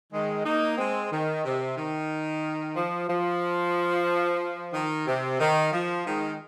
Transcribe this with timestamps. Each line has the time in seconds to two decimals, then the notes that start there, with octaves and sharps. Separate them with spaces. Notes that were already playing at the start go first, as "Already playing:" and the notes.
0.12 D#3 G#3
0.45 A#3 D#4
0.78 G#3 C4
1.12 D#3
1.44 C3
1.77 D#3
2.76 F3
3.09 F3
4.74 D#3
5.07 C3
5.40 D#3
5.72 F3
6.05 D#3 G#3